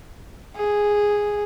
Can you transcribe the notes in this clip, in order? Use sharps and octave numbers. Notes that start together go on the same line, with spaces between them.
G#4